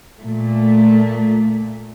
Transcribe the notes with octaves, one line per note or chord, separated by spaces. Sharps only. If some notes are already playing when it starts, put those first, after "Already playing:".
A#2 A3